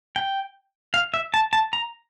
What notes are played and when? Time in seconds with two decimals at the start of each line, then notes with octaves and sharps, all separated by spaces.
0.16 G5
0.94 F5
1.14 E5
1.34 A5
1.53 A5
1.73 A#5